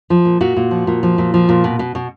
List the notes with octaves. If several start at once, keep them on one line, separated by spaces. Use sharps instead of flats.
F3
A#2
A#2 F#4
A#2
F3
A#2
F3
A#2
F3
A#2
B2
B2
B2